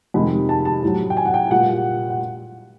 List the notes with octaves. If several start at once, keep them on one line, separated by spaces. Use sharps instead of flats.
F2 C3 D#3 G#3 B5
A5
A5
A2 F#3
G5
G#5
F#5
G5
A#2 G3 F#5
F#5